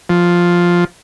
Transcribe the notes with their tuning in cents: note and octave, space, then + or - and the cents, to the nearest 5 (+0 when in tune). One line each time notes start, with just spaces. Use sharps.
F3 +5